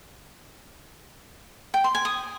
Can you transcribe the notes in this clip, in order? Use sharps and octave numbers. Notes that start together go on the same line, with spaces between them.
G5
C6
G#5
D#6